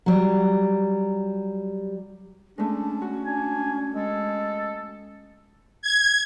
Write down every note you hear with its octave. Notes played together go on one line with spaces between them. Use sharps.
F#3 G3
G#3 A3 C#4 D4
F#4
D4 G#5
G#3 A4
G#6